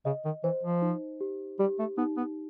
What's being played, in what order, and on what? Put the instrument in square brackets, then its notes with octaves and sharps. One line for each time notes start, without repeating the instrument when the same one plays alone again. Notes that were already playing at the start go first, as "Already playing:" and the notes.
[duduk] C#3 [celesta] D#5
[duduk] D#3
[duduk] E3 [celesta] C5
[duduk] F3
[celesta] D#4
G4
[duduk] G3 [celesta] G4
[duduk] A3
[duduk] B3 [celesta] D#4
[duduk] B3